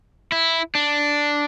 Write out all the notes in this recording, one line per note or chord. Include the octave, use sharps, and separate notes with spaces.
E4
D4